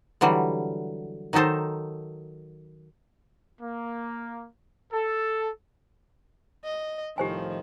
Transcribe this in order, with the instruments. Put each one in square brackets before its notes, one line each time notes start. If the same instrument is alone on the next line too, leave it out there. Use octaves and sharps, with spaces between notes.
[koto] D3 E3 F#3 G3
D#3 F#3 D#4 A4 C5
[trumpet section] A#3
A4
[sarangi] D#5
[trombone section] C2 A2 F3 [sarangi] D#3 [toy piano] G4 C5 G#5